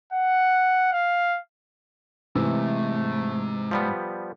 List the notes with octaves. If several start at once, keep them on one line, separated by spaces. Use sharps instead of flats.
F#5
F5
G#2 C3 E3 A3
F3 G3 B3